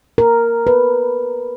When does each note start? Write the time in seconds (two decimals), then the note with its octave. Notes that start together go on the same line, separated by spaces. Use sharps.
0.18 A#4
0.67 B4